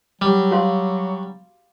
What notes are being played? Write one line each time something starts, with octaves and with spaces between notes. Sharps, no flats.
F#3 G3
F#4 F5 C6